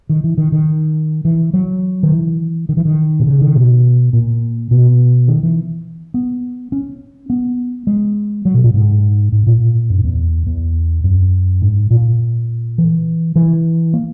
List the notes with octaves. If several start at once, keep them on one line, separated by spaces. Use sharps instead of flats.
D#3
E3
D#3
D#3
E3
F#3
D#3
E3
D#3
E3
D#3
B2
C#3
D#3
B2
A#2
B2
D#3
E3
B3
C#4
B3
G#3
F#3
B2
A#2
G#2
G#2
A#2
F#2
E2
E2
F#2
G#2
A#2
E3
E3
A#3